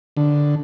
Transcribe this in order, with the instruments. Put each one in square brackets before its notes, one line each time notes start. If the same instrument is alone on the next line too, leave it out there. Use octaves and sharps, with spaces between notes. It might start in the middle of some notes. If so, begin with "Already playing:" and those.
[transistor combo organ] D3